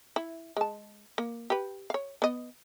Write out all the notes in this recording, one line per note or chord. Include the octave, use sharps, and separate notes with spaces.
E4
G#3 A5
A#3
G4 B4
C#5 F5
B3 D#5